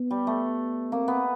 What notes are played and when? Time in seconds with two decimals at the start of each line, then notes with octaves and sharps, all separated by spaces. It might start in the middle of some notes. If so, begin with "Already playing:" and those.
Already playing: B3
0.11 G3
0.27 A3
0.92 A#3 C4
1.08 B3